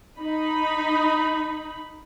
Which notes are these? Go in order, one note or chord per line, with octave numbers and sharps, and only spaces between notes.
D#4 B5